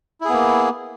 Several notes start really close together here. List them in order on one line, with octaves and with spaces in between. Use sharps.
E4 G#4 B3 A#3